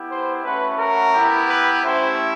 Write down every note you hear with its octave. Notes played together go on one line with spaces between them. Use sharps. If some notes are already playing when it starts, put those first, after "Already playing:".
Already playing: B3 E4 G4
C5
A3 C#4 F#4 B4
A#4
B3 E4 G4
B4
A3 C#4 E4 G4 C5